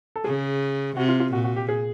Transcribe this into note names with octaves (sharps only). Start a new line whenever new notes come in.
A4
C#3 G#4
C3 F#4
F4
F4
A#2 F#4
F#4
G4
G#4